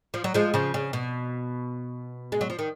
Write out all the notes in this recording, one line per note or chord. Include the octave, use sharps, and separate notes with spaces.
F3
F#3
F3 G#3
C#3 F3
C#3
B2
G#3
F#3
F3
D#3